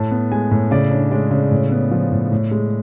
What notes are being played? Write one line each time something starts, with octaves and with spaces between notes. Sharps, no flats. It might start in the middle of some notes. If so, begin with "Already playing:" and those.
Already playing: A2 A5
B3
G#3 G#5
A2
C#3 D5
D4
G#3 D5
C#3
A2
B3
F3
A2
A2
G#3